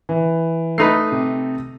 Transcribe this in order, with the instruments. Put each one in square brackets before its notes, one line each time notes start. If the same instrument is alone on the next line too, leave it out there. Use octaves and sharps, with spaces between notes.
[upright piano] E3
[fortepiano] A3 D#4 B4 [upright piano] C7
[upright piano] C3